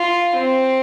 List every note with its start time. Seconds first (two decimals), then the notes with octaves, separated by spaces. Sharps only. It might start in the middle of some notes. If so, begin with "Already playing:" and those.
Already playing: F4
0.36 C4